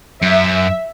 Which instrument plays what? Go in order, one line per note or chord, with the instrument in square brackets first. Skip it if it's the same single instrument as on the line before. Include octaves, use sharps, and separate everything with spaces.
[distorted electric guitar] F#2 [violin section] E5